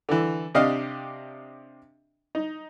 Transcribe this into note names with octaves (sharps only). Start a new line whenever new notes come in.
D3 E3
C3 D4 G4 D#5 F5
D#4